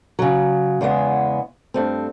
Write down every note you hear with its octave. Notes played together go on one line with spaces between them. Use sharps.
C#3 F#3
E2 C#3 G#3 B3
G2 A3 C4